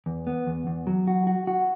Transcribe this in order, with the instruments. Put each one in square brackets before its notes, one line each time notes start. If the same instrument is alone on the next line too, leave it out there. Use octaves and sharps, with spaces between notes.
[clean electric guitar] E2
B3
E2
E2
F#3
F#4
F#4
F#4